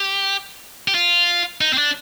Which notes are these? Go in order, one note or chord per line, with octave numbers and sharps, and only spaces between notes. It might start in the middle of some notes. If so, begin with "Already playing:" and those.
Already playing: G4
G4
F4
D#4
C4
D4